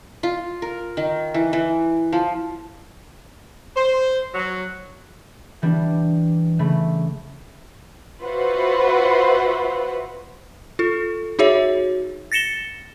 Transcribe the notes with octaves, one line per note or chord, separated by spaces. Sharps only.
F4
A#4
D#3
E3
E3
F3
C5
F#3
E3 G3 B3 D4
C#3 G3 A3 B5
F4 F#4 B4 C5 E5 F#5
F4 A4
D#4 F#4 G#4 C#5 E5
A6 A#6 C#7 E7 G7